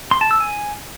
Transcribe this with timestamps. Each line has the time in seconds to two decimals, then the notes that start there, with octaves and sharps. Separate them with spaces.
0.11 C6
0.21 A5
0.31 E6
0.40 G#5